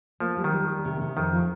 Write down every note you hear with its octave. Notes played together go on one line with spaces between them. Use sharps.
F3 A#3
G3
D#3
G3
G3
C3
C3
F2 D#3
F3